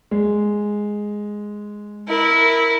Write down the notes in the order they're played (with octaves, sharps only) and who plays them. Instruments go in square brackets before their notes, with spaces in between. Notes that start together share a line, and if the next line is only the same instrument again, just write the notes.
[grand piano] G#3
[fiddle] E4 A#4